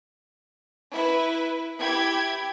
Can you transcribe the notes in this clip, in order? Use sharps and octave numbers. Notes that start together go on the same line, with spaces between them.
E4 B4
E4 G4 G5 G#6